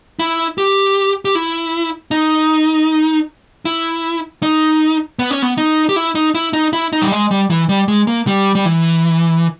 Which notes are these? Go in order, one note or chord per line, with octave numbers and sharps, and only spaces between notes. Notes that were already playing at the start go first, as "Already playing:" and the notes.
E4
G4
G4
E4
D#4
E4
D#4
B3
C#4
B3
D#4
G4
E4
D#4
E4
D#4
E4
D#4
G3
G#3
G3
E3
G3
G#3
A#3
G3
G3
E3